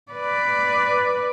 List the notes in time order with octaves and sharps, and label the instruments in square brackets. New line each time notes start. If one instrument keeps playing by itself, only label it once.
[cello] B4 D5